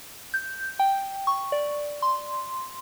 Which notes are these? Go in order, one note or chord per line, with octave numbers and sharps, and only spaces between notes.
G6
G5
C#6
D5
C6